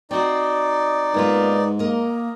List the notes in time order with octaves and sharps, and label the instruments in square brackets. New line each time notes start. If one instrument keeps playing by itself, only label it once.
[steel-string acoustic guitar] C4 F#4 [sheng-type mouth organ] D#4 D5
[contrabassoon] G#2 [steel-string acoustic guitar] A#3 B3 F4 [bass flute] B4
[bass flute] A#3 [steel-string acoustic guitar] A#4 D#5